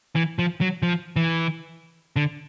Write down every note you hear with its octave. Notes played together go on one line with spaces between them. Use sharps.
E3
F3
F#3
F3
E3
D3